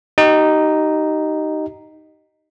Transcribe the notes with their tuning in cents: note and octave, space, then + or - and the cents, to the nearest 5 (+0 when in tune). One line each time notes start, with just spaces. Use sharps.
D#4 +0 G4 -30